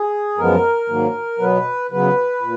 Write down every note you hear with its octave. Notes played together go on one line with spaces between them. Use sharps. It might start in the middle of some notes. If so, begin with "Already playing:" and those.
Already playing: G#4
F#2 F3 G#3 B3 A#4
G#2 D#3 F#3 A#3
B2 F#3 B3 B4
C#3 F#3 B3 B4
A#2